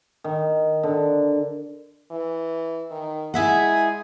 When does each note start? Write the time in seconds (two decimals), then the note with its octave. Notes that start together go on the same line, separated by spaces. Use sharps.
0.24 D#3
0.83 D3
2.11 E3
2.91 D#3
3.34 G#3 E4 G#4 E5 F#5